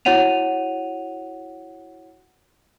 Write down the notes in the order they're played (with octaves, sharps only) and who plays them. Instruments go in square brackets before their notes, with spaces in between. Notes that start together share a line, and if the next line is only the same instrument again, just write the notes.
[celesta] E4 F#4 C#5 F#5 D#7 F7